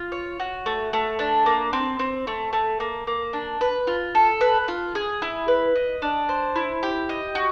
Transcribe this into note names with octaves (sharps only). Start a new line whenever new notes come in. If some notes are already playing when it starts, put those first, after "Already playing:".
Already playing: F4
C#5
F#4
A3
A3
D4
A#3
C4
C4
A3
A3
A#3
A#3
D4
B4
F4
A4
B4
F4
G#4
E4
B4
D#5
D4
C5
E4
G4
D#5
F#4